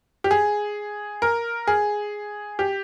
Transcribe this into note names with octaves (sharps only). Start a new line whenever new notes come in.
G4
G#4
A#4
G#4
G4